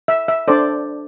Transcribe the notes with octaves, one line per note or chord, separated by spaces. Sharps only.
E5
E5
D4 A4 C5 D5